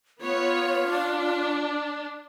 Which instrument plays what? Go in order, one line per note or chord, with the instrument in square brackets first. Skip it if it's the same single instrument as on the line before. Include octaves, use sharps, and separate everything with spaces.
[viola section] B3 C#5 [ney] F4
[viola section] D4